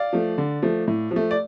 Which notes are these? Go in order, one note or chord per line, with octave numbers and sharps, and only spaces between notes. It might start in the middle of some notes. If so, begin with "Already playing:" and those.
Already playing: D5 F5
F3 A3
D3
F3 A3
A2
F3
A3
D5